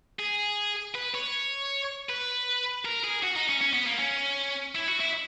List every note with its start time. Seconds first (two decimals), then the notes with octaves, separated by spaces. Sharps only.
0.19 G#4
0.95 B4
1.15 C#5
2.10 B4
2.85 A#4
3.04 G#4
3.23 F#4
3.36 D#4
3.49 C#4
3.61 C#4
3.74 B3
3.87 A#3
3.99 C#4
4.75 E4
4.88 F#4
5.00 E4